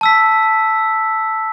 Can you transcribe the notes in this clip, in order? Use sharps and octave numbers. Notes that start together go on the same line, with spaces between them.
A5 E6 B6